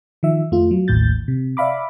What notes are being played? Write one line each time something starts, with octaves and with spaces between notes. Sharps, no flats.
D#3 F3 E5
F2 A3 F4
F#3
A1 D#2 A2 G6 A6
C3
D5 E5 F5 B5 D6